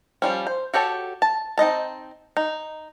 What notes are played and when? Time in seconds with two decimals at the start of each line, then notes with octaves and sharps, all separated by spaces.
0.22 F3 G3 C#4
0.47 C5
0.74 F#4 G4 A4 C#5 A5
1.22 A5
1.58 C4 D#4 D#5 A5
2.37 D#4